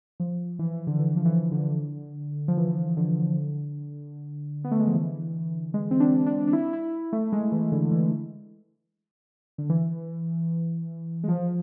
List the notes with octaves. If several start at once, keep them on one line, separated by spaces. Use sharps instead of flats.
F3
E3
D3
E3
F3
E3
D3
F3
E3
D3
B3
A3
G#3
F3
E3
G#3
C4
D4
D4
D4
E4
E4
A3
G#3
E3
D3
E3
D3
E3
G#3
F3